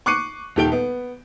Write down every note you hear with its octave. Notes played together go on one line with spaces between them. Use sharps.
C#6 D6 F#6 C7 C#7 D#7
D#1 D#3 G4 A4 D7 G7
B3